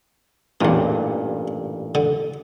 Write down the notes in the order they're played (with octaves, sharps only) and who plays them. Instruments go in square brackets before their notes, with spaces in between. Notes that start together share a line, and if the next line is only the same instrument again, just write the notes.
[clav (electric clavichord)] A1 G2 A#2 [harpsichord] E2 E3
[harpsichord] D3